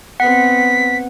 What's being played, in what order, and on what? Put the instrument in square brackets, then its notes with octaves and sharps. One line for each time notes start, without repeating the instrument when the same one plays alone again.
[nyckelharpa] B3 C4 [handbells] F#5 [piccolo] B6